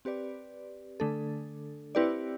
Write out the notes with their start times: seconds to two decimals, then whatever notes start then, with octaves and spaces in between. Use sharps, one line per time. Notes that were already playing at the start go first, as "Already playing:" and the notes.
0.05 C4 G4 B4 D5
1.00 D3 A3 D4 A4
1.95 C4 E4 G4 B4 D5